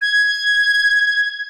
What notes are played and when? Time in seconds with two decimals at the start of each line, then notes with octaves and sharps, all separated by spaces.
0.02 G#6